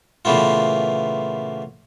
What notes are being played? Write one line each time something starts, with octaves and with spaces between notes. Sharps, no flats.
A#2 C#3 E3 A3 B3 F4